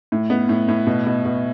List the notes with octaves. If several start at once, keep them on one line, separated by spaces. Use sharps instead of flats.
A2
B3
A2
A2
B2
B2
B2